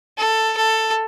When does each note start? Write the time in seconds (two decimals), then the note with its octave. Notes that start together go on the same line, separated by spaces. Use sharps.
0.18 A4
0.57 A4